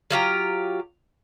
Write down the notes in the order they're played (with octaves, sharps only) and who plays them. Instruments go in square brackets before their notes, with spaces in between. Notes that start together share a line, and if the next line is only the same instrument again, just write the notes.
[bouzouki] F#3 F4 G4 A#5